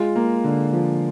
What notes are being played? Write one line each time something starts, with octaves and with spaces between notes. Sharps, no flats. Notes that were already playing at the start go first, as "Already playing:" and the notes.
Already playing: G#3 F4
A#3
D3
F3